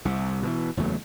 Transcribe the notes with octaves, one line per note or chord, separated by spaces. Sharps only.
C2 C3
B2 D#3 E3
F#1 E2 F#3 A3